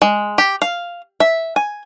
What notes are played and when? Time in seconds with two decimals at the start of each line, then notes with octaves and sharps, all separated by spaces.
0.02 G#3
0.38 G4
0.62 F5
1.20 E5
1.56 G#5